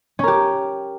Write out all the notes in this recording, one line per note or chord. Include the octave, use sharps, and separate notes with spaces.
C#4 G4 A#4